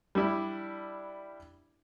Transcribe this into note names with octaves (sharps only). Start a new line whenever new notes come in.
G3 D4 E4